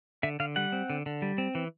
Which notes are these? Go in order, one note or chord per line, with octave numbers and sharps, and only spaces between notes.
D3 E5
D3 F5
G3 F#5
C4
D3
D3
G3
C4
E3